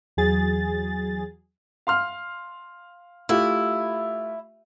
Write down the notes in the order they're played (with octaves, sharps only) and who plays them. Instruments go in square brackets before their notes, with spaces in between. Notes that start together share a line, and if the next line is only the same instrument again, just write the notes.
[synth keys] E2 F#3 G#4 A6
[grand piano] F5 C6 F6
[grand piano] A3 F4 G4 [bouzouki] E4